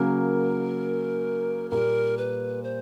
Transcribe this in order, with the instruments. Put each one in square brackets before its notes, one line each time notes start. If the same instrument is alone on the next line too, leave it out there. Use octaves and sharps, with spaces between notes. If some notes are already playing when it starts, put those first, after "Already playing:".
Already playing: [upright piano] C#3 F#3 A#3 [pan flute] A#4
[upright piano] A#2 G3 A#3 [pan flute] A#4
[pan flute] B4
C5